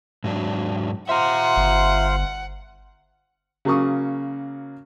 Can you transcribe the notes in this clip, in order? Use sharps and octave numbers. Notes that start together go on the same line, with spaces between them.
G#2 F#3 D4
F4 C5 E5 F#5 A#5
G1
C#3 F#3 A#3 C#6 D#6